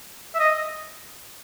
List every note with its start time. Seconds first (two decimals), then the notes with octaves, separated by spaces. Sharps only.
0.35 E5
0.39 D#5